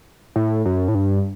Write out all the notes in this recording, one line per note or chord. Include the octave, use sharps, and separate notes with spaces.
A2
F#2
A2
G2